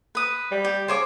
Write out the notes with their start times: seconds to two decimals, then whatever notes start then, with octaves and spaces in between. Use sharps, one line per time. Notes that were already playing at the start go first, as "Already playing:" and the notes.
0.15 B4 D#6
0.51 G3
0.65 G4
0.88 C#3 C5 C#5 D6